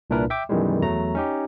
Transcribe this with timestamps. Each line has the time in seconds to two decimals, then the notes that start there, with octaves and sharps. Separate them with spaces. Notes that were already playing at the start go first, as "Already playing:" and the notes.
0.10 C2 A#2 D4 E4 A#4 B4
0.30 E5 G5 D6
0.49 F#2 B2 D#3 E3 G3 G#3
0.82 E2 F#3 A3 A#5
1.15 C#4 D#4 G4